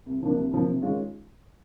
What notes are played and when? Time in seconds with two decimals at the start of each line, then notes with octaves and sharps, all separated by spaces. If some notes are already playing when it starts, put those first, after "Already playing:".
0.06 C2
0.21 C3 F3 A#3 D4
0.37 C2
0.52 C3 F3 A#3 D4
0.66 C3
0.82 D#3 G#3 C#4 F4